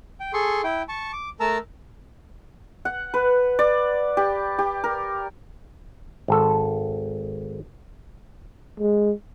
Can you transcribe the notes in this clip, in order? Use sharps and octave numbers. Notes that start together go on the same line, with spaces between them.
G5
G#4 A4 C6 C#6
E4 G5
A5 C#6
D6
A3 A#4 A5 A#5 E6
F#5
B4
D5
G4
G4
A#4
G#1 A4
G#3